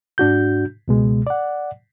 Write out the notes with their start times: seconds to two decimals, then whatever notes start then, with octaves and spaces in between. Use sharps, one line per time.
0.18 G#2 D4 F#4 G6
0.88 C#2 B2 G#3
1.27 D5 F#5